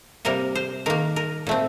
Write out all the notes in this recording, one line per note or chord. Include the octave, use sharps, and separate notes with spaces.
C3 G3 A#3 A#4
C5
D#3 A#3 A#4
A#4
A#2 A3 C4